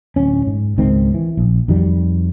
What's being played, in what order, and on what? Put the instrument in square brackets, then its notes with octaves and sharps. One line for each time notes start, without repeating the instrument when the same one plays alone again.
[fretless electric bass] D1 C#4
G#2
C#2 G#2 D#3 C4
E3
A#1
F2 D#3 F#3 G3